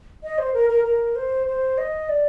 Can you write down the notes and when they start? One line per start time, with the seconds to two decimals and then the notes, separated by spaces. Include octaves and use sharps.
0.23 D#5
0.38 C5
0.54 A#4
0.70 A#4
0.85 A#4
1.16 C5
1.47 C5
1.78 D#5
2.09 D5